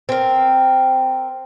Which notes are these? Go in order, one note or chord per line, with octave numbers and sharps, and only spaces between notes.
C4 A#4